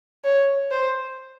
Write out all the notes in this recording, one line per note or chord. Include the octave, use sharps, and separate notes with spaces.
C#5
C5